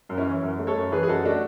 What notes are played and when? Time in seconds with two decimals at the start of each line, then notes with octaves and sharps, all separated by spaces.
0.09 F#2
0.18 C#4 E4
0.26 E3
0.43 F#2
0.59 A3
0.67 A4 C#5
0.76 F#2
0.92 E3 G#4 B4
1.03 G#4
1.08 F#2 F#4 A4
1.25 A3 D4 F#4